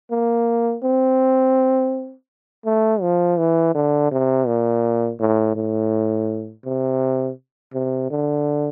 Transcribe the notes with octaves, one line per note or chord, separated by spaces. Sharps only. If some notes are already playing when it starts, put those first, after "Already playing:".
A#3
C4
A3
F3
E3
D3
C3
A#2
A2
A2
C3
C3
D3